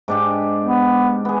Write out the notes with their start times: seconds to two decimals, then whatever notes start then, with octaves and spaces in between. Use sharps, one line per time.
0.08 G#2 D4 G4
0.63 B3
1.25 B3 G#4